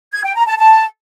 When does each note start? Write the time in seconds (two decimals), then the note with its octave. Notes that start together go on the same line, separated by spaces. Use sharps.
0.12 G#6
0.23 G5
0.35 A#5
0.46 A5
0.58 A5